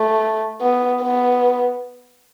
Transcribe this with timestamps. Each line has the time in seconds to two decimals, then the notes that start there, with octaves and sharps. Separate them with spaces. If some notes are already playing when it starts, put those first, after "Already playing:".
Already playing: A3
0.61 B3
1.02 B3